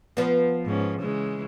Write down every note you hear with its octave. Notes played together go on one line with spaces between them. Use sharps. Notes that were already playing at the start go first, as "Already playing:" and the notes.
F3 B3
G#2 C#4
C#3 E3 G#3